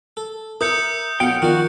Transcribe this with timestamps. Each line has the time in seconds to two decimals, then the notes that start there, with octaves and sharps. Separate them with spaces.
0.17 A4
0.61 E4 A#4 E5 D#6 G6 C#7
1.20 B1 F#3 F4 F#5 G5
1.42 D#3 F3 F4 F#4 A#4 D5